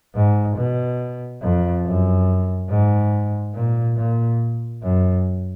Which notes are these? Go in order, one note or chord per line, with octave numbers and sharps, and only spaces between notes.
G#2
B2
F2
F#2
G#2
A#2
A#2
F#2